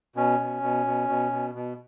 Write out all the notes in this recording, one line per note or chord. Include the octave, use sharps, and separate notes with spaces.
B2 C#4
B2
B2
B2
B2
B2
B2